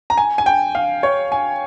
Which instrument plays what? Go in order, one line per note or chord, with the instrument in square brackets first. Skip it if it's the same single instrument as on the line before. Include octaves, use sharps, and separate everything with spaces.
[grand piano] A#5
G#5
G#5
G5
F5
C#5
G#5